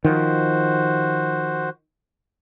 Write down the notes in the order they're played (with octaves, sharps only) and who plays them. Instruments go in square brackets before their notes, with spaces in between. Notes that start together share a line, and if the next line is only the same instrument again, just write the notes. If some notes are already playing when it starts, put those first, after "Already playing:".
[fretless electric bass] D#3 F3 [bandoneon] F#4 C5